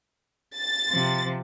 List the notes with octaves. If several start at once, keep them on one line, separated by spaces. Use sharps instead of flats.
A6
C3 F3